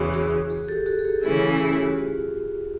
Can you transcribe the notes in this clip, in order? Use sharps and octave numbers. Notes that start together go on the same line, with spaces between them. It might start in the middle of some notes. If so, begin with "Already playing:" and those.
Already playing: E2 C#3 E3 F#4 G#4
F#4 G#4
F#4 G#4
G4 A4
F#4 G#4
G#4
G4 A4
C#3 E3 A3 C#4 E4 F#4 G#4
G#4
G4
F#4
F4 G4